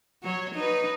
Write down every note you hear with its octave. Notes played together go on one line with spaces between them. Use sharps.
F#3 C#5
D#4 B4